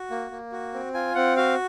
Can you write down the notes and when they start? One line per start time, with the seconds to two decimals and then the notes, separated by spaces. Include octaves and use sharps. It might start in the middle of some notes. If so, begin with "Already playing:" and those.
Already playing: F#4
0.11 A#3
0.31 A#3
0.52 F#4
0.74 C4
0.94 F4 G#5
1.15 C4 F#5
1.36 F#4 F5